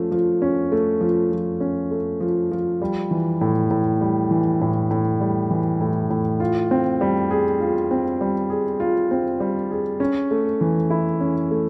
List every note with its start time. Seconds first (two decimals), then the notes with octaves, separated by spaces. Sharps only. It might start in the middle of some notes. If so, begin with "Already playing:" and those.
Already playing: F3 A3 C#4
0.11 F3
0.42 C#4
0.72 A3
1.01 F3
1.32 F3
1.60 C#4
1.91 A3
2.20 F3
2.51 F3
2.82 G3
3.11 E3
3.41 A2
3.71 A2
4.01 G3
4.31 E3
4.61 A2
4.91 A2
5.21 G3
5.51 E3
5.81 A2
6.10 A2
6.40 F4
6.71 C4
7.01 G3
7.31 G#4
7.60 F4
7.91 C4
8.21 G3
8.50 G#4
8.80 F4
9.11 C4
9.40 G3
9.71 G#4
10.00 C#4
10.31 A3
10.61 E3
10.90 E4
11.21 C#4
11.51 A3